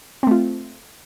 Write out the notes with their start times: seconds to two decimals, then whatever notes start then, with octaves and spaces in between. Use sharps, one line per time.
0.23 C4
0.27 A3
0.31 F4